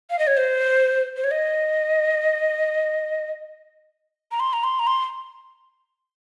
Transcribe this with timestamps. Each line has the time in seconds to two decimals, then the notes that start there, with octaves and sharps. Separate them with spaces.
0.10 F5
0.19 D#5
0.27 C#5
0.37 C5
1.17 C5
1.24 C#5
1.31 D#5
4.32 A#5
4.40 C6
4.53 A#5
4.64 C6
4.79 A#5
4.87 C6